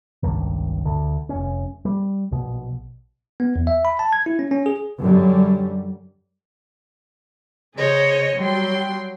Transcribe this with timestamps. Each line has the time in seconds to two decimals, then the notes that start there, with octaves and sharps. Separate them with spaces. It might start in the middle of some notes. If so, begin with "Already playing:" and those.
0.23 G#1 C#2 G2 D#3
0.85 D2 D3
1.29 F1 C#4
1.85 G3
2.31 A#1 B2
3.40 B3
3.56 E2
3.67 E5
3.85 B5
3.99 A5
4.13 G#6
4.26 E4
4.39 C#4
4.51 C#4
4.66 G#4
5.00 F#2 D3 G3
7.76 C#3 G#4 C5 C#5 D#5
8.36 F#3 G3 G5 C6